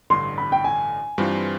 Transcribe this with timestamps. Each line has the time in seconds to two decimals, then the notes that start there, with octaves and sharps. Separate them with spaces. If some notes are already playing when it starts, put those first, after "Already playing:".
0.10 A1 G2 D3 C6
0.38 B5
0.52 G5
0.64 G#5
1.18 G2 E3 G3 C4 F4